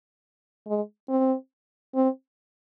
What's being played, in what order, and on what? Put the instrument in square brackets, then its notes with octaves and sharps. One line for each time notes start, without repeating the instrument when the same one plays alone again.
[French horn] G#3
C4
C4